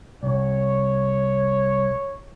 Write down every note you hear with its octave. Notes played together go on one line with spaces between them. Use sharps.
C2 C#5